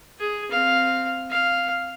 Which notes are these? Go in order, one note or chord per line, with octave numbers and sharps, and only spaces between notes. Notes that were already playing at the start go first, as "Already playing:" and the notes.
G#4
C4 F5
F5